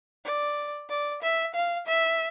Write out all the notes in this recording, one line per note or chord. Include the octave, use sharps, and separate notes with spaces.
D5
D5
E5
F5
E5